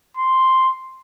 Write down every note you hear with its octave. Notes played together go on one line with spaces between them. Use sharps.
C6